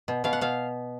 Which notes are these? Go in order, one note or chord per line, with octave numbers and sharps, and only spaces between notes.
B2
B2 F5
F#5
B2 F5